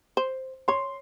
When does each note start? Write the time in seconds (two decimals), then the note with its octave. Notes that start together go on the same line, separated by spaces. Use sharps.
0.17 C5
0.68 C#5 C6